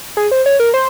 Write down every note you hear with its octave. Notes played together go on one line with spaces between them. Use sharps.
G#4
C5
C#5
A#4
C5